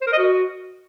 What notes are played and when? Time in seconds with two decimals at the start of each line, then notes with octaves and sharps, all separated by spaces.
0.01 C5
0.07 A#4
0.13 D#5
0.18 F#4